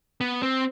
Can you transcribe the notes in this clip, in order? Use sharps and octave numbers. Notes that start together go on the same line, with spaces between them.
B3
C4